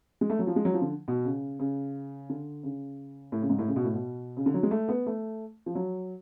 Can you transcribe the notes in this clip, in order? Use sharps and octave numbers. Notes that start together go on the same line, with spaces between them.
G#3
A3
F#3
F3
G#3
F#3
F3
D3
B2
C#3
C#3
D3
C#3
A2
C#3
G#2
A2
C#3
B2
A2
B2
C#3
D3
F#3
G#3
A3
B3
A3
F3
F#3